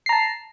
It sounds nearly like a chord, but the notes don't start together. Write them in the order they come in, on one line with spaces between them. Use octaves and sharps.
C7 A#5 A5